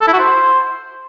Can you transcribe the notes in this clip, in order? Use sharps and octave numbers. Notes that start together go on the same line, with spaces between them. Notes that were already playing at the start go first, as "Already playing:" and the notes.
A4
E4
F#4
C5